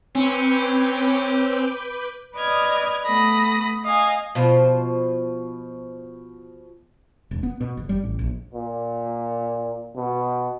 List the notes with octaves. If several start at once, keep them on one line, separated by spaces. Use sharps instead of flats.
C4 C#4 B4 D6 G6
B4 D5 D#5 D#6 F6 G#6
A3 B3 B5 D#6 A#6
D#5 F5 G#5
B2 F3 F4
E1
B3
B2
F#1
G3
A1
A#1
A#2
B2